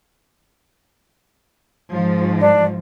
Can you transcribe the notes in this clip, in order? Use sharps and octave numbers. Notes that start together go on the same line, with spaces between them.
G#2 F3
D4